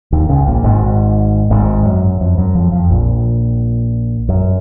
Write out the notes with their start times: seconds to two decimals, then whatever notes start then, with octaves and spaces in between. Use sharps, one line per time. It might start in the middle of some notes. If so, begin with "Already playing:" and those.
0.12 D#2 D#3
0.29 C#2 C#3
0.46 A#1 A#2
0.64 G#1 G#2
1.50 G#1 G#2
1.86 F#2
2.21 F2
2.38 F#2
2.55 F2 F3
2.72 F2 F3
2.90 A#1 A#2
4.29 F#2